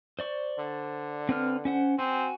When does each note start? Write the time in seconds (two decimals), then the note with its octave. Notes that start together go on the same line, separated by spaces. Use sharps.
0.19 C5 D5 C#6
0.59 D3
1.29 C4 B4 F6
1.65 C#4 C5 F#5
1.99 C4 F#4 G#5